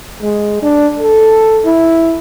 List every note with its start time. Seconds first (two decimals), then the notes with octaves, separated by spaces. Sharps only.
0.22 G#3
0.63 D4
0.99 A4
1.66 E4